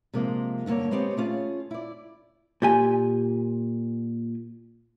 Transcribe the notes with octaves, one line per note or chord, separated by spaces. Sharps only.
C3 F3 G#3 A#3
G2 D3 F#3 A#3 C#5
G#3 B3 C4 G4 C#5
A3 C#4 F4 G#4
E4 D5
A#2 G4 G#5